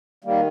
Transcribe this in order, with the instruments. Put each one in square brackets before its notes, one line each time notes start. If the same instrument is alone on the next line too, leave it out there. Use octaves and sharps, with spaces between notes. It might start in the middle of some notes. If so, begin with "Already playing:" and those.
[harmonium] D#3 G3 A#3